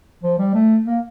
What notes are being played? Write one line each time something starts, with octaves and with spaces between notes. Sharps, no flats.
F3
G3
A3
A#3